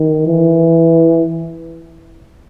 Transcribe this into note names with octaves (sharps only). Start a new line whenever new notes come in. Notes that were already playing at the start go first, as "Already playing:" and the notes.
Already playing: D#3
E3